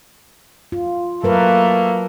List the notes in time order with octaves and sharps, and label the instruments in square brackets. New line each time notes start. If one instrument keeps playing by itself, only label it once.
[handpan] F4
[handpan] F#3 A#4 B4 [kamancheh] A3 A#3